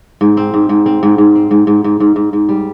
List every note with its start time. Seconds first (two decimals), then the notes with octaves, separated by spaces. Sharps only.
0.21 G#2
0.37 C4
0.54 G#2
0.69 G#2
0.86 C4
1.03 G#2
1.18 G#2
1.35 C4
1.51 G#2
1.67 G#2
1.84 G#2
2.00 G#2
2.16 G#2
2.33 G#2
2.49 G3